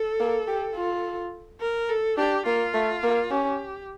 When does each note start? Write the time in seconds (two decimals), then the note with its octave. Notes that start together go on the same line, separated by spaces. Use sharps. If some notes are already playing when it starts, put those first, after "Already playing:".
Already playing: A4
0.20 A#3
0.48 G4
0.76 F4
1.61 A#4
1.89 A4
2.18 D4 G4
2.46 A#3 F4
2.74 A3
3.03 A#3
3.31 C#4 G4